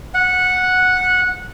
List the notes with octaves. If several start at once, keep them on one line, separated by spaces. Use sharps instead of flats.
F#5